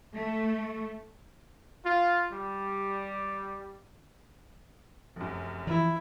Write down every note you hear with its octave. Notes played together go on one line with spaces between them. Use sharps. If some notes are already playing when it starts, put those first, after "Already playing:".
A3
F4
G3
F1 F#2
E3 F3 E4